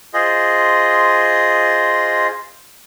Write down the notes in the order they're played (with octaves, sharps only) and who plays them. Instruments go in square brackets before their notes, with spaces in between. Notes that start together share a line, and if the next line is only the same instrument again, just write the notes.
[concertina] F4 G#4 C5 D#5 C6